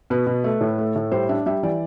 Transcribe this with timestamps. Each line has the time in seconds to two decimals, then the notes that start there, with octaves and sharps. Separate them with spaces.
0.10 B2 B4
0.27 B2
0.44 A3
0.61 A2
0.78 A3
0.96 A2
1.12 G3 C5
1.29 D4 E5
1.46 G3 E5
1.63 E3 D5